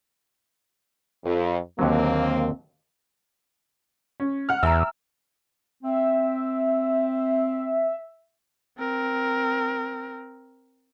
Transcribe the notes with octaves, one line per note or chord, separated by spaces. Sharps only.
F2
D#2 D3 F#3 A#3 C4
C#4
F#5 F6
E2 E5 G#5 A#5 E6
C4 E5
C4 A#4